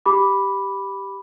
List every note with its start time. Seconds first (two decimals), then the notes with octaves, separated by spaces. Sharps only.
0.06 G4 B5 D6